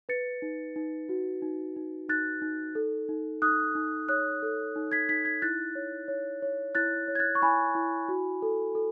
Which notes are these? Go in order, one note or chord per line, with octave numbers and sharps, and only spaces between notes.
B4 A6 C#7
D#4
D#4
F#4
D#4
D#4
D#4 F#6 A6
D#4
A4
D#4
D#4 D#6 F#6
D#4
C#5 D#6 F#6
A4
D#4
G#6 B6
D#4 G#6 B6
G#6 B6
E4 F#6 A6
C#5
C#5
C#5
E4 F#6 A6
C#5
G#6
F#6 A6
C#6
E4 G#5 B5
E4
F#4
A4
A4